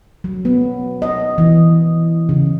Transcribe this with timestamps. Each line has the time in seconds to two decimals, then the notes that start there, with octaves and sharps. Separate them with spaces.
0.24 F#3
0.45 B3
1.02 D#5
1.38 E3
2.29 C#3